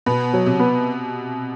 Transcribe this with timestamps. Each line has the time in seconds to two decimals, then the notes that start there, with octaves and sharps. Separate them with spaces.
0.06 B2 B3
0.33 F#3
0.46 C3
0.60 B3